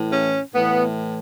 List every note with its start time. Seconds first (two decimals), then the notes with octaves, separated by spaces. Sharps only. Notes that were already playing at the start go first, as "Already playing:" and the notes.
Already playing: A2 E3
0.12 C#4
0.53 A2 E3 B3